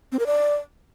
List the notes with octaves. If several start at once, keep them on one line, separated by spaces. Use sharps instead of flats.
C4
A#4
D5